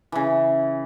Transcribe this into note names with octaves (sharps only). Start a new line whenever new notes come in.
C#3 E3